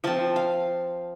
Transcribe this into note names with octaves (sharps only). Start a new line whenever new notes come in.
F3 C4 A5
F5